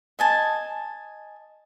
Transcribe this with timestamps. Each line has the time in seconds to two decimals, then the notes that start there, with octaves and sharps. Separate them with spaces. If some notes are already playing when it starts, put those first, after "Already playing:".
0.19 D#5 G#5 A5